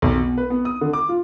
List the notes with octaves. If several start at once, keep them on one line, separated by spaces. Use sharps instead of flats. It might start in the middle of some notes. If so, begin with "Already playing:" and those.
B1
B2
B4
B3
D#6
D3
D6
F4